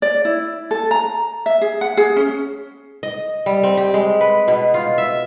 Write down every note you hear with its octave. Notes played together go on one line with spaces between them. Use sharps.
D5
E4
A4
A#5
E5
G#4
F#5
G#4
C#4
D#5
G3
C4
G4
G#3
B4
B2
F4
E5